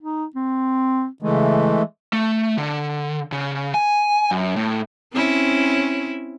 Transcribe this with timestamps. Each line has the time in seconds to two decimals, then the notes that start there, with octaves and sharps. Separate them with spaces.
0.01 D#4
0.36 C4
1.22 C#3 E3 G#3 A3
2.13 A3
2.58 D3
3.32 C#3
3.74 G#5
4.31 F#2
4.56 A2
5.13 C4 C#4 E4